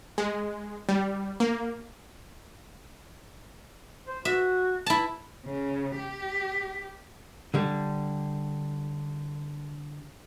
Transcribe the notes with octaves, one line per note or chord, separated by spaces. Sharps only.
G#3
G3
A#3
C5
F#4 E5
E4 A5
C#3
G4
D3 G3